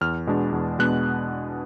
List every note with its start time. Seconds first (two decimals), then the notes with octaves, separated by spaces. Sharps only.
0.01 E2 F6
0.27 B2 G#3 B3 D4
0.52 E2
0.79 B2 G#3 B3 D4 F#6